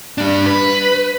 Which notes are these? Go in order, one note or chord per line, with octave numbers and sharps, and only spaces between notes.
G3 D4
B4